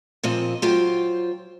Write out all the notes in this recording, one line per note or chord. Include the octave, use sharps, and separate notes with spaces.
A#2 F3 C4 D#5
F#3 F4 C5 G5